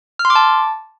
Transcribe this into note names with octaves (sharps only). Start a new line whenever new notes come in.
F6
C6
D6
A5